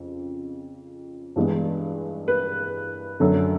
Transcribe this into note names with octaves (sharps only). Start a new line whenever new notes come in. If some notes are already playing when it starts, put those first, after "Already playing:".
Already playing: F2 C#3
G2 E3 G#3 B3
B4
F#2 D3 F#3 A3